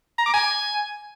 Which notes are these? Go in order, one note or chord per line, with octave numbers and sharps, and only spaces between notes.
A#5
D6
G#5